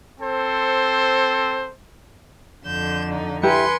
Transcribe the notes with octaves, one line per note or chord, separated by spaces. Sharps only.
C4 A4 C5
F2 D3 G6 E7
D#4
E4 G4 B4 E5 G#5 C6 C#7